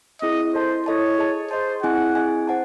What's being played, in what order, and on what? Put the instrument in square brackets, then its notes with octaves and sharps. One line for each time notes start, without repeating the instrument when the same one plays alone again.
[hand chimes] C4 E4 G#4 [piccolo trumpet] D#5
[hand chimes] E4 A4 D#5 A5 [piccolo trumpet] C5
[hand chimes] E4 A4 D#5 A5 [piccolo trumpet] C#5
[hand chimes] G#4 D#5 A5
[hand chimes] G#4 D#5 A5 [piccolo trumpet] C5
[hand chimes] C4 E4 G#4 D#5 G#5 [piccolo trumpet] F#5
[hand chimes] C4 E4 G#4 D#5 G#5
C5 F#5 A5